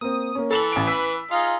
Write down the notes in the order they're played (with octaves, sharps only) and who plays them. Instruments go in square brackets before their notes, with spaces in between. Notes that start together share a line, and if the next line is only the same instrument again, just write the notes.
[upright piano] A#3 C4 [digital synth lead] D#6
[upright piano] A#3 C#4
[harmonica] E3 [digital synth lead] A4 [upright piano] A6 F7 F#7
[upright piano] A1 D7
[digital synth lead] B4 [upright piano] E6 B6
[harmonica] D#4 F4 G#4 [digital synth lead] F5